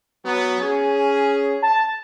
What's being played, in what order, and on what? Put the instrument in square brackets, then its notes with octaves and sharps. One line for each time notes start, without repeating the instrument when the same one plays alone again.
[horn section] F#3 B3
C#4 G#4
[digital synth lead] A5